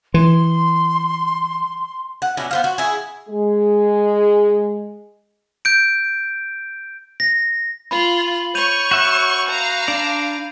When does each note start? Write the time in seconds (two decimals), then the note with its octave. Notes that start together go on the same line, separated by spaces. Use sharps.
0.14 E3 C6
2.22 F#5
2.37 B2 C#4 D4 E4
2.51 B3 C5 F5
2.64 F#4
2.78 E4 G#4
3.29 G#3 G#4
5.65 G6 D7
7.20 A#6
7.91 F4 B5 F#7
8.55 C#5 C#6 G6 D#7 F7
8.91 F#4 E5 F#5
9.49 F5 A#5
9.88 D4 D5